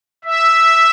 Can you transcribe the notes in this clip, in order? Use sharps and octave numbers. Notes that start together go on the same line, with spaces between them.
E5